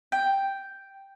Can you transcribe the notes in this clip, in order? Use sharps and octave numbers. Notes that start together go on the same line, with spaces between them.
G5